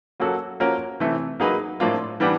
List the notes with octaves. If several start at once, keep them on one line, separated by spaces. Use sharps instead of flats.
F#3 A#3 C#4 F#4 A4
F3 A#3 C#4 F#4 A#4
C3 E3 A3
F#3 A#3 D#4 G#4 B4
A2 F3 A#3 D4 F4
E3 G3 B3 D4 G4